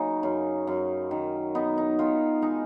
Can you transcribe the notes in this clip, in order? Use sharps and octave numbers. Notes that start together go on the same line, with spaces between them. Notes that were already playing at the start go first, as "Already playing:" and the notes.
Already playing: C#3 F#3 A#3 D#4 A#4
F#2
F#2
D#3
B3 D#4
D#4
D#3 F4
G#3 D#4